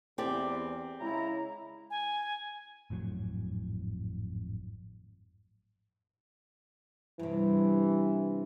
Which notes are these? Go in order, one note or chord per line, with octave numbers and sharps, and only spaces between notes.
E2 C4 G4 D5
C#3 G#3 E4 A#5
G#5
G#1 F2 A2 F#3
G2 C3 E3